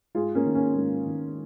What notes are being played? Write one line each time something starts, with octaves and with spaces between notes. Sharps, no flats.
G#2 F4 G#4
A#3 C#4
D#3
A#3 C#4
G#2 A#3
D#3